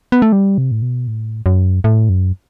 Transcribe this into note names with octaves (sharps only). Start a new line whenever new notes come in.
B3
A3
G3
C3
A2
B2
A2
F#2
A2
F#2